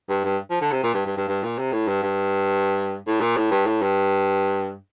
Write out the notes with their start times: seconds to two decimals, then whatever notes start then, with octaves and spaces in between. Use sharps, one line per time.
0.09 G2
0.24 G2
0.50 F3
0.61 D3
0.72 C3
0.83 A#2
0.94 G2
1.06 G2
1.17 G2
1.28 G2
1.43 A#2
1.58 C3
1.72 A2
1.87 G2
2.03 G2
3.07 A2
3.21 A#2
3.37 A2
3.51 G2
3.66 A2
3.81 G2